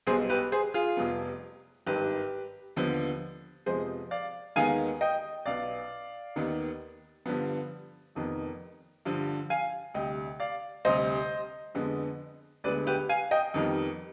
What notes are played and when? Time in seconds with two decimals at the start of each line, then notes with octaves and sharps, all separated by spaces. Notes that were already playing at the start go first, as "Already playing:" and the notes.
0.07 B1 B2 G3 B3 G#4 C5
0.29 G4 B4
0.52 G#4 C5
0.74 F4 G#4
0.97 F1 F2 C3 G3 B3
1.86 G#1 G2 D#3 G4 B4
2.76 D#2 D3 F3 B3
3.66 F2 C3 F3 G#3 B3 G#4 C5
4.11 D5 F5
4.56 D#2 D#3 G#3 B3 F5 G#5
5.01 D#5 G5
5.46 B1 B2 B3 D5 F5
6.36 D#2 D#3 B3
7.26 G2 D3 F3 B3
8.15 F1 F2 D#3 B3
9.05 G2 D3 F3
9.50 F5 G#5
9.94 D2 C3 G3 D#5 G5
10.40 D5 F5
10.85 D2 C3 G3 C5 D#5
11.75 F2 D3 G#3 B3
12.64 D2 D3 G#3 B3 B4 D5
12.87 G4 B4
13.09 F5 G#5
13.31 D#5 G5
13.54 F2 D#3 G3 B3